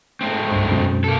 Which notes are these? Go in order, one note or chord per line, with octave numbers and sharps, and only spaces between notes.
G#2 A3 C4
C#2 G2
F#2 B2
A#3 A4